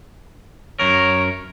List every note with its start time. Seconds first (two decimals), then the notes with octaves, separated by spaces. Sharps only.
0.80 F#2 A#4 C#5